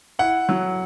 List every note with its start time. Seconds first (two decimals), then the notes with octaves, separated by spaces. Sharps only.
0.19 E4 F#5
0.49 F#3